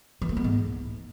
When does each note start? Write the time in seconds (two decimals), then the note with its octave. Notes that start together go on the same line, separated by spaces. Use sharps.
0.22 E3
0.29 A3
0.37 B3
0.44 G#2